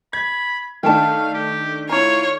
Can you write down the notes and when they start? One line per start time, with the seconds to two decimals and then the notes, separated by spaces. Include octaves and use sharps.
0.13 B5 G#6
0.83 D#3 A3 D4 F5 G5 A5
1.34 G4
1.89 E4 F4 C#5 A#5